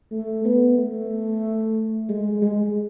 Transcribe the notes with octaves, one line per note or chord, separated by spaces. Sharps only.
A3
B3
A3
G#3
G#3